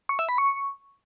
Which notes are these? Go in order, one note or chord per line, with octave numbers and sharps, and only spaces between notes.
C#6
E5
B5
C#6